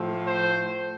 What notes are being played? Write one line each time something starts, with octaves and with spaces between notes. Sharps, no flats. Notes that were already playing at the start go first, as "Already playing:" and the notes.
Already playing: A2 F3 A3
C5